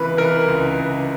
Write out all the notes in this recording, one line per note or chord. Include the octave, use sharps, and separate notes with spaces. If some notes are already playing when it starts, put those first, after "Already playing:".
Already playing: C#2 C3 E3 A#4 B4
E3 A#4
C#2
C#2